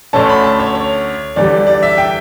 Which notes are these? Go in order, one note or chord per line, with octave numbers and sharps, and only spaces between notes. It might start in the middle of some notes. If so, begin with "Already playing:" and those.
D2 D3 A3 C#4 A5
B5
A5
C#5
C#5
E2 D3 G3 D5
D5
E5
G5